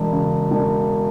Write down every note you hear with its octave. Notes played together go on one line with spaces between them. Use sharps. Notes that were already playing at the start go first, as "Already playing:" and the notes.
Already playing: E1
C#3
E1